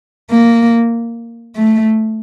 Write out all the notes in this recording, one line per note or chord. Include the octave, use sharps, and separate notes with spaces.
A#3
A3